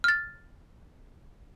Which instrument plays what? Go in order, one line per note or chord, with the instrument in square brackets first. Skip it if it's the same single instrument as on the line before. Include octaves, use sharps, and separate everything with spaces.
[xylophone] F6 A6